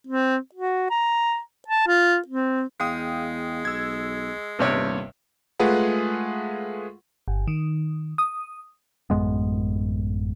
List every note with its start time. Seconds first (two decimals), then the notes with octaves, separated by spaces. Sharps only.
0.07 C4
0.55 F#4
0.90 A#5
1.68 A5
1.87 F4
2.28 C4
2.80 E2 G#3 F5 G5 D#6
3.65 B1 E6 G#6
4.59 D#1 G2 C3 B3 C#5
5.60 G#3 A3 F4 G#4 B4 F#5
7.28 G1
7.47 D#3
8.18 D#6
9.10 A1 F#2 G#3 B3